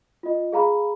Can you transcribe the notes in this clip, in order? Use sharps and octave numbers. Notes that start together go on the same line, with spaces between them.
F4 D#5
G#4 F5 A#5 B5